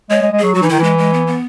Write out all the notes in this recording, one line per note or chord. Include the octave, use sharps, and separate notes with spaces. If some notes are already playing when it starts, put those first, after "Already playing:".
G#3 C#5
G#3
G#3
F#3 G#4
F#3 F#4
E3 D#4
D#3 E4
E3 G#3
G#3
B3
B3